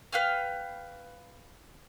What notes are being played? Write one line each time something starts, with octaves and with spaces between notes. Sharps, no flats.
B4 F5 G5 F6